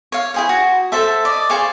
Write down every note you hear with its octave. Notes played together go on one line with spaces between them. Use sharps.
C#5 F5
E4 G#4 C5
F#4
A4 C5 E5 A5
D5 D#5
G#4 C5 F5 C#6